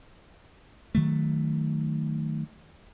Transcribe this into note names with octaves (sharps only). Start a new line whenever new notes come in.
D#3 F#3 A3